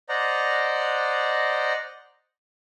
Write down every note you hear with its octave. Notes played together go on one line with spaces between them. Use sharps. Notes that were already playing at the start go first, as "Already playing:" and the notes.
C5 D5 D#5 F#5 A#5